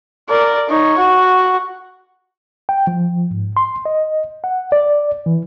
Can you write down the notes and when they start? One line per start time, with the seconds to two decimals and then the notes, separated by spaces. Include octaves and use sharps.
0.29 A#4 D5
0.69 D#4 C#5
0.98 F#4
2.69 G5
2.87 F3
3.31 G#2
3.57 C6
3.86 D#5
4.44 F#5
4.72 D5
5.26 E3